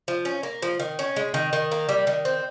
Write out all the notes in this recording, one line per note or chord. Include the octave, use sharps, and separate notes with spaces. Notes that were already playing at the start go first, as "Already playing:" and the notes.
F3
C#4
A#3
F3
D#3
C#4
G#3
D#3
D#3
A#3
G3
D#3
C4